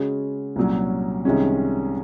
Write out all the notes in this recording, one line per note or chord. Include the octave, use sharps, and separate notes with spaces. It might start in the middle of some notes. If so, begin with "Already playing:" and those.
Already playing: C#3 G#3 C#4 F#4
C2 A#2 F#3 C#4
C2 C3 D#3 G#3 C#4